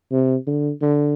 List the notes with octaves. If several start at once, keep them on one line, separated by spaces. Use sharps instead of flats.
C3
D3
D3